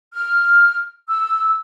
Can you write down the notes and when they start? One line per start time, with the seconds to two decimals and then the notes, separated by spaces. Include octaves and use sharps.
0.14 F6
1.08 E6